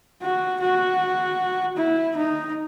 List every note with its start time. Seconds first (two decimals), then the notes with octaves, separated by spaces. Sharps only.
0.22 F#4
0.60 F#4
1.77 E4
2.16 D#4